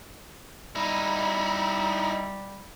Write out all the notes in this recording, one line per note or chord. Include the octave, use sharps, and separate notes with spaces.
G3 D#4 E4